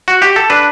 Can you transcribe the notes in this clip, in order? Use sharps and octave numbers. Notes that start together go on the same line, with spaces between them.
F#4
G4
A4
D4 B4